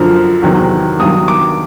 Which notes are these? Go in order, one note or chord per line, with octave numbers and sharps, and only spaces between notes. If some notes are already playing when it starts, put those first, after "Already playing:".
Already playing: F#2 D3 F3 F6
E2 C3 D#3 F#3
G2 D#3 F#3 D#6
D6